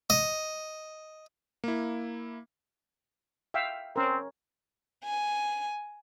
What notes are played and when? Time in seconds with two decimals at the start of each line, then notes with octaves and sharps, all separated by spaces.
0.10 D#5
1.64 A#3 E4
3.54 E5 F5 G5
3.96 C4 C#4 A#4
5.05 G#5